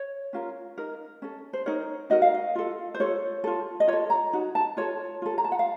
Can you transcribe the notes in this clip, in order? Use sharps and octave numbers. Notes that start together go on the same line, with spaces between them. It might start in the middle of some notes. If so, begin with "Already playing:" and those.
Already playing: C#5
C#4 F4 A#4
D#4 A#4
C#4 A4
C5
D#4 A#4 C#5
D#4 F#4 A#4 D#5
F5
D#5
F4 A4
C5
F4 A4 C#5
F4 A4
D#5
F4 C#5
A4
A#5
D#4 F#4
A5
F4 A4 C#5
F4 A4
A#5
A5
F#5
F5